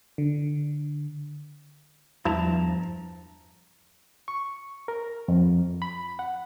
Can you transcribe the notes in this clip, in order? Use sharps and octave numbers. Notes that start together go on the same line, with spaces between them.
D3
E2 G2 E3 F3 A5 A#5
C#6
A#4
F2
B5
F#5